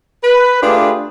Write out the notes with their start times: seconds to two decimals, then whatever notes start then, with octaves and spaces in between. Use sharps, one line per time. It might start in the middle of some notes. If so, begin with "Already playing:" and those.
0.23 B4
0.62 A3 D4 F4 G4 G#4 B4